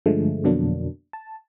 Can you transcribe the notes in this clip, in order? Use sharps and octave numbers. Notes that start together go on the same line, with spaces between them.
G2 D3 F3 G#3 A3
F2 B2 D3 F#3 A#3 D4
A5